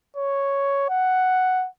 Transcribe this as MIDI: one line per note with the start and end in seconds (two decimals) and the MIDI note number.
0.16 0.85 73
0.89 1.67 78